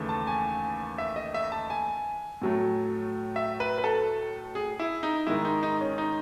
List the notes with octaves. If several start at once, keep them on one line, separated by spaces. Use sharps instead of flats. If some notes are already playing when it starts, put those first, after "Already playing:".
Already playing: D#2 C#3 E3 A3
A5
G#5
E5
D#5
E5
A5
G#5
A2 F#3 A3
E5
B4
B4
A4
G#4
E4
D#4
G#2 D#3 G#3 E4
D#4
D#4
C#4
D#4